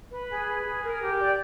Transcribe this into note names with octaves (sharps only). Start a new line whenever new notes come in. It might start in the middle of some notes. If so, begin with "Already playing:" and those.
B4
G#4
B4
G#4
A#4
G4
D5